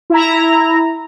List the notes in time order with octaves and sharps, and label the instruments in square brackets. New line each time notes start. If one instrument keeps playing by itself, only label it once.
[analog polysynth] E4 A#5